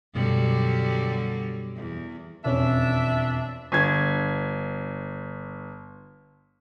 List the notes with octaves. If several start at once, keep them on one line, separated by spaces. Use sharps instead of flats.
F#2 B2 D3 F#3 G3
E2
E1 F2 C#4 D4 E5
G1 G#6